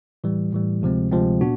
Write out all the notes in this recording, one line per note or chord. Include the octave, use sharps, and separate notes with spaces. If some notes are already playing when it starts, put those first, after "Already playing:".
A2 E3 G3
A2 E3 G3
D2 C3 F3 G#3 C4
D2 C3 F3 G#3 C4
A#2 B3 D4 F#4